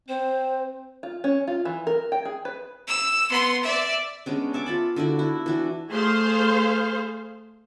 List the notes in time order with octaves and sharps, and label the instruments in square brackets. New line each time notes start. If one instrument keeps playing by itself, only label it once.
[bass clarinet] C4 [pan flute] C5
[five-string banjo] F4
C#4
F4
E3
A#4
G5
G#4
B4
[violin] E6
B3 C6
D5 E5
[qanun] G#3 B3 C#4 D4
C#5 E5 A5 D6
F4 A5 B5
D3 D4 E4 F#4
E4
E3 D4 F#4
[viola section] A3 G#4 C5 F5 C6